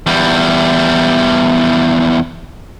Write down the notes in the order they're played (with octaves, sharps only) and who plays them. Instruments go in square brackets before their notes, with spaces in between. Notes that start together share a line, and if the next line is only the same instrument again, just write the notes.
[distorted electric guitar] E2 G3